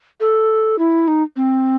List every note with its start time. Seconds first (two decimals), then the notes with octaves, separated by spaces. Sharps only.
0.20 A4
0.79 E4
1.08 D#4
1.36 C4